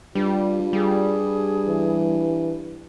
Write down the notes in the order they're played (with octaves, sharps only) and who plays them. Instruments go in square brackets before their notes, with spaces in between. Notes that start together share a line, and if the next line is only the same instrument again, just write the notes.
[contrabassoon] G2 [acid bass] G3 [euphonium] F4
[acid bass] G3 [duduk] G#4
[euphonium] E3